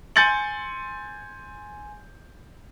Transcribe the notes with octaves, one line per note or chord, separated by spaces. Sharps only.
G#5 C6 G6 A6 C#7 F#7